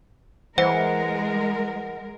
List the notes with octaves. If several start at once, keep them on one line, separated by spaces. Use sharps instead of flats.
E3 G#3 A#4 C5 F#5